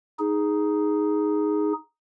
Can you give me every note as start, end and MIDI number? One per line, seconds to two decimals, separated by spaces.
0.19 1.73 63
0.19 1.73 68